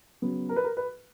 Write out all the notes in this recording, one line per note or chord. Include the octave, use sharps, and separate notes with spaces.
C#3 F#3 B3
A#4
B4
A#4
B4